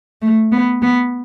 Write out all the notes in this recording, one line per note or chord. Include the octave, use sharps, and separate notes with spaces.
A3
B3
B3